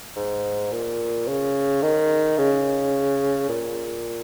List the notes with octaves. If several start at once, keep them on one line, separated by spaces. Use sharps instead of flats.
G#2
A#2
C#3
D#3
C#3
A#2